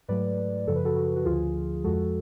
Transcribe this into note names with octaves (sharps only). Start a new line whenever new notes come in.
G#2 F#3 A3 B4 D5
F#2 C#3 F3 A4
B4
F#4 A4
F#4 A4
F#4
D2 D3 F3 F4 G#4
F2 F3 G#3 F#4 A4